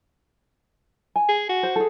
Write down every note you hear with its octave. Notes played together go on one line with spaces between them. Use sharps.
G#5
G#4
F#4
C5
G#4 A4